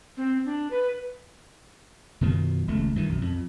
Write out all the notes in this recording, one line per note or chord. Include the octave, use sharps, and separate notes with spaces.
C4
D4
B4
F#2 B2 D#3 F3
D#1 C#2 A3
G2 D#3 E3
B1 F#2
F2